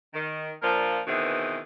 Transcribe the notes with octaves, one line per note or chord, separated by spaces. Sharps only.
D#3
A#2 F3 A#3 D4 A#4
B2 D#3 E3 C4 F#4 G#4